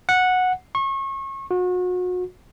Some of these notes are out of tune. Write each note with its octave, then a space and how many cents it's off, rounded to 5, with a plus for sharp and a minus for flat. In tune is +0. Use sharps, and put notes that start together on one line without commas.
F#5 -10
C#6 -30
F#4 -35